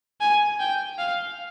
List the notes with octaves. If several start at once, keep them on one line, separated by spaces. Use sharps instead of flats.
G#5
G5
F5